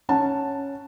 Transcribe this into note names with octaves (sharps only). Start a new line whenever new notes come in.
C#4 F#5 A5